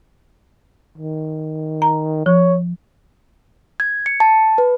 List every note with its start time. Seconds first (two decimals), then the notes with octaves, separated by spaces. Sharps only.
0.98 D#3
1.82 A#5
2.26 F3 C#5
3.80 G#6
4.06 C#7
4.20 A5
4.58 B4